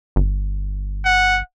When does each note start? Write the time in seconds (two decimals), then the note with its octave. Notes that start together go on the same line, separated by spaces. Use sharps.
0.16 G1
1.05 F#5